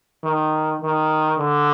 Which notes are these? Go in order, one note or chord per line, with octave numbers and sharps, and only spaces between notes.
D#3
D#3
D3